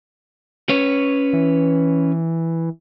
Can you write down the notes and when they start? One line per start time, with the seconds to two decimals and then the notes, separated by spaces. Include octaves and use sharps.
0.69 C#4 B4 C#5
1.33 E3